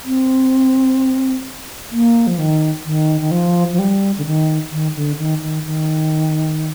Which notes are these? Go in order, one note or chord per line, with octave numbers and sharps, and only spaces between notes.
C4
A#3
F3
D#3
D#3
D#3
F3
F3
G3
D3
D#3
D#3
D3
D#3
D#3
D#3